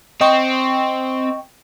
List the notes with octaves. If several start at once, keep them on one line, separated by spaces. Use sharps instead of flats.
C4 D#5 G5 C#6